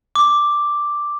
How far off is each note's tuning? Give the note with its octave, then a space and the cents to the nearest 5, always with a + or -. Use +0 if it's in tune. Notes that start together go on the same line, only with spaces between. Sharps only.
D6 +0